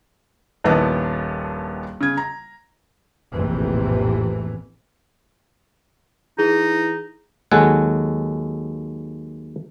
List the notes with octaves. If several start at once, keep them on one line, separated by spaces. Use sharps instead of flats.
D#1 A#1 D#3 B3 E4 A5
C#3 G#6
A#5
F1 A#1 F2 A2 C3 E3
E3 D#4 G#4
D#2 F#3 G#3 A4 F#5 G#5